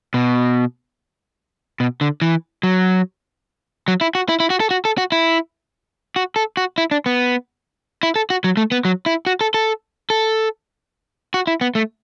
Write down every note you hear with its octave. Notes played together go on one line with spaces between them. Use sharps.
B2
B2
D3
E3
F#3
F#3
E4
F#4
E4
E4
F#4
A4
F#4
A4
F#4
E4
F#4
A4
F#4
E4
D4
B3
E4
A4
F#4
F#3
A3
B3
F#3
E4
F#4
A4
A4
A4
F#4
E4
B3
A3